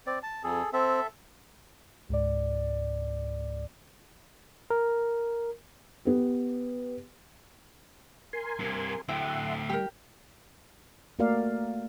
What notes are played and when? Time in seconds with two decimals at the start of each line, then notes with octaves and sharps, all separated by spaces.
0.06 C4 D5
0.23 A5
0.44 F2 G#4 A4
0.73 C4 A4 E5
2.09 C#2 G#2 D5
4.70 A#4
6.05 B3 G4
8.33 A#4 G#5 C6
8.59 G2 C3
9.08 D2 A2 E4 E5 F#5 G5 C6
9.69 G3 G4 A#4
11.19 A3 A#3 F#4 A#4 D5 F5